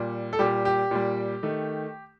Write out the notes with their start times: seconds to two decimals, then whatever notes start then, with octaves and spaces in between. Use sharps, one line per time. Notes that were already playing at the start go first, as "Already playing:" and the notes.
Already playing: A#2 G3
0.33 A4
0.39 A#2 G3 G4
0.65 G4
0.91 A#2 G3
1.43 D#3 A3